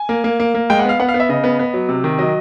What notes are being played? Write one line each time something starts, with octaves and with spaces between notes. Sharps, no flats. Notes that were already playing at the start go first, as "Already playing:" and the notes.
Already playing: G#5
A#3
A#3
A#3
A#3
G#3 G5
F#5
B3 F5
B3 F#5
F5
B3
E5
C#3 D#5
B3
B3
F#3
C3
D#3
F#3 D#5